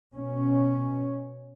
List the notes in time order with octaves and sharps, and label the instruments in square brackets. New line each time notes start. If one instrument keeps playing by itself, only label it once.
[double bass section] B2 C#4